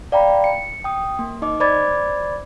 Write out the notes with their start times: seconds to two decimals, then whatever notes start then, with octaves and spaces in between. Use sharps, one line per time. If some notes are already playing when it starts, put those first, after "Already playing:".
0.12 D5 F5 G5 A#5 B5
0.44 C#7
0.84 G5 D#6
1.19 A#3
1.42 D#4 D#5 D6
1.60 C5 D5 B5 D6 G#6 A6